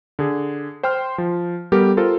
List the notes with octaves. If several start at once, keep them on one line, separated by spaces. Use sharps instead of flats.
D3 G#4
C5 G5 C6 F6
F3
G3 B3 G4 A4 A#4
F4 A4 A#4 C5